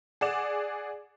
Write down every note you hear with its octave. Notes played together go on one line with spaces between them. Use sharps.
G#4 D5 F#5 E7